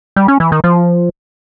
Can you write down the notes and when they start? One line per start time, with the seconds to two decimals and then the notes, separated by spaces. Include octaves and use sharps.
0.16 G3
0.28 C#4
0.40 E3
0.52 D#3
0.64 F3